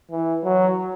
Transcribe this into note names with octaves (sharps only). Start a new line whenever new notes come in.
E3
F#3